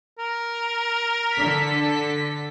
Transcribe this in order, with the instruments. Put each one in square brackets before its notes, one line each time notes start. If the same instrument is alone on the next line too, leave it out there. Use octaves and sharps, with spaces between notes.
[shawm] A#4
[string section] D3 A4 B6